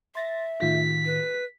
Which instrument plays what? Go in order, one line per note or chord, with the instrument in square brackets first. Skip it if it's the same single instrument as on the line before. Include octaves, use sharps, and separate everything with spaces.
[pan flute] E5 [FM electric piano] C6 A6 A#6
[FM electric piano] A2 D#3 F4 [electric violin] B6
[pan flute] B4